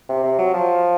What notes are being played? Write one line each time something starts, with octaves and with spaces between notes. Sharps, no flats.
C3
C3
F#3
F3